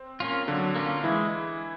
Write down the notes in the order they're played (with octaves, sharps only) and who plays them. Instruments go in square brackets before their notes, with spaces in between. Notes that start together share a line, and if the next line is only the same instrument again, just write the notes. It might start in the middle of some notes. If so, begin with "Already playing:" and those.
Already playing: [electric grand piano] C4
[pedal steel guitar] A#3 C#4 F4
[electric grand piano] D3 D4 [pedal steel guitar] F#3
[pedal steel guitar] A#3 C#4 F4
[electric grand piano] E3 E4 [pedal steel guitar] G#3